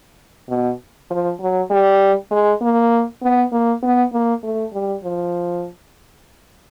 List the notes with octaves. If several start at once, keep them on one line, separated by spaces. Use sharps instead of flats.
B2
F3
F#3
G3
G#3
A#3
B3
A#3
B3
A#3
A3
G3
F3